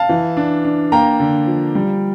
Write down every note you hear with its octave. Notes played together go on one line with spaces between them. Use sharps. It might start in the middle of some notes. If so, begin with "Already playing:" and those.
Already playing: F5 A5
E3
D4
D4
A#3 G5 A#5
D3
F3
G3